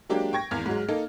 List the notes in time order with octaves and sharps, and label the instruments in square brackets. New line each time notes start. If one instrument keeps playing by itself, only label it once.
[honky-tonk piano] F#3 G#3 A#3 D4 G4
G5 C#6 G#6 A#6
G#1 E2 F6
G#2 F#3 G#3
A#3 D#4 A4